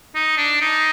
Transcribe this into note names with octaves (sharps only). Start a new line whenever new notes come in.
D#4
D4
D#4